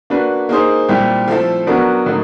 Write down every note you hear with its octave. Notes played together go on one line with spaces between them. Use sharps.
A#3 D4 F#4 B4
A#3 D#4 G#4 C5
A#2 G3 C4 E4 G4
F3 A3 C4 E4 A4
F#3 B3 D4 F#4 A#4
A2 F#3 A#3 D#4